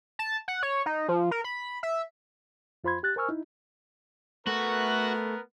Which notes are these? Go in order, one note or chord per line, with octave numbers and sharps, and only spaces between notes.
A5
F#5
C#5
D#4
F3
A#4
B5
E5
F2 F4 C5 B5 C6 G#6
G4 F#6 A6
A#4 C5 G#5 C#6 E6 F6
D#4 E4
A3 B3 F#4 A#4 B4